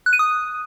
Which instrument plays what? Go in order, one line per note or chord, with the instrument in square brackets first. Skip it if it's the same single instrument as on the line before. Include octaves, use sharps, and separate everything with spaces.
[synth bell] F#6
D#7
D#6